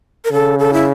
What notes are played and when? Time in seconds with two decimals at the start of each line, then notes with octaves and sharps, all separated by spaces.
0.25 A#4
0.32 C#3 A4
0.59 A4
0.73 E4